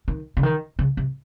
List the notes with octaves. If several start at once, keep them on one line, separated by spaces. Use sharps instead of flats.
D#3
C#3
D#3
C#3
C3